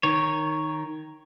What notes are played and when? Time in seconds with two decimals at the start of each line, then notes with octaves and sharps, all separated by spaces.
0.03 D#3 C#5